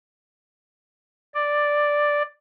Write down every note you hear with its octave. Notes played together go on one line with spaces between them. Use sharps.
D5